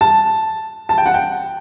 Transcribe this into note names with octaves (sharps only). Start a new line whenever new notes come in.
A5
A5
G5
F#5
G5